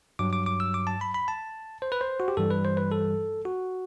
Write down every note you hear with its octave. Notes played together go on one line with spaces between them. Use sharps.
G2 F#3 D6
D6
D6
E6
D6
A5
B5
B5
A5
C5
B4
C5
F#4
G4
G2 E3 G3 A4
B4
C5
B4
A4
F#4